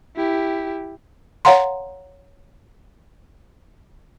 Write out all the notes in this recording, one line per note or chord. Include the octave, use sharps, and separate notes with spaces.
E4 G4
C#5 F5 F#5 A#5 C6